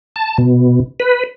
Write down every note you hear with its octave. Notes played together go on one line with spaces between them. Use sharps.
A5
B2
B4